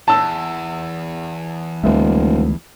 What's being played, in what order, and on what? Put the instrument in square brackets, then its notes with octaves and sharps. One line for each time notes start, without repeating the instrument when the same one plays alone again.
[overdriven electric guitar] E2 [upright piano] A5 E6
[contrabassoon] D#1 [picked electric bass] D2 G#3 A3